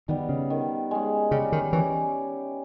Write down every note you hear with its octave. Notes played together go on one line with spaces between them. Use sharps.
D#3 G3 B3 D#4
C#3
D#3
G#3 C#4
C#3 G3
D#3
E3 C#4 G4